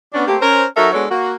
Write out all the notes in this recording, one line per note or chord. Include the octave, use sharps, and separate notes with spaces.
B3 C#4 D4
A3 A#3 C4 G4
C#4 A#4 C5
F#3 D#4 F#4 A4 A#4 E5
G#3 B3 D4 F#4 A4 C#5
A#3 F#4